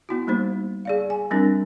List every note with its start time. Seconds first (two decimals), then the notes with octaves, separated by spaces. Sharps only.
0.09 B3 E4 F#4
0.27 G3 A#3 D#4 C5
0.85 G#4 D5 F5
1.10 G#5
1.31 G3 C4 D4 E4 A#4